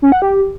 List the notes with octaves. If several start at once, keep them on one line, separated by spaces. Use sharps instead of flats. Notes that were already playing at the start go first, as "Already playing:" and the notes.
C#4
F#5
G4